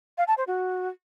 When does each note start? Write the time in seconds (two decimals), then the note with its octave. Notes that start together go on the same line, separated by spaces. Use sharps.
0.18 F5
0.28 A5
0.37 C5
0.47 F#4